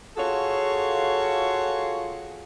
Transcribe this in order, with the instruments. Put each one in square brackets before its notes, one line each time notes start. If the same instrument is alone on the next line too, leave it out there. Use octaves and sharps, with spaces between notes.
[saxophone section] F4 F#4 G#4 A4 C#5